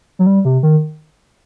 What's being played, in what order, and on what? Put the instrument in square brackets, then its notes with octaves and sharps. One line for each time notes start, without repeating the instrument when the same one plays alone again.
[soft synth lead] F#3
G3
C3
D#3